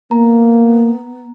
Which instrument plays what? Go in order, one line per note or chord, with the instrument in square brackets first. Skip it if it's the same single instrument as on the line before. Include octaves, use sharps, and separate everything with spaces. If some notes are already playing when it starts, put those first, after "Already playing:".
[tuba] A#3 [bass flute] B3 [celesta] A#5